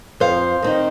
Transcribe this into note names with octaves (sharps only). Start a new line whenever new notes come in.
F2 C5 F5
D#3 C4 D#4